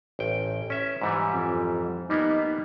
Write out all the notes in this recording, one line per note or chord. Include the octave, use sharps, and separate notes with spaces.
A1 G5
C#4 E5
G#2 E3 G3
F2
G3 A#3 B3 D#4